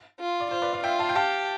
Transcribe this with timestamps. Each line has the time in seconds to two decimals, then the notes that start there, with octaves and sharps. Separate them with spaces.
0.19 F4
0.40 D5
0.51 F4 C5
0.62 B4 D5
0.73 D5 F5
0.83 F4 E5 G5
0.99 F5 A5
1.09 G5
1.15 G4 F5 A5